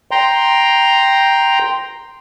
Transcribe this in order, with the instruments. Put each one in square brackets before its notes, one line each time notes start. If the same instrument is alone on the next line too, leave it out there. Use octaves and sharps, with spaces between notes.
[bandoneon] G5 A#5 C6